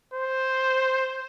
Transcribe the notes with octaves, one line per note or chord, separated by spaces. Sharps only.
C5